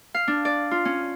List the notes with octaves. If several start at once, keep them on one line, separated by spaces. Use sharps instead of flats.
F5
D4
D5
F4
C#4